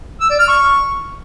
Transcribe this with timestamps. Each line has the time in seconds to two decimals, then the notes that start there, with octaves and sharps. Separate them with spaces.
0.21 E6
0.30 D5
0.39 F6
0.49 C#6